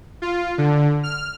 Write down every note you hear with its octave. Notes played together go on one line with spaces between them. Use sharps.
F4
D3
F6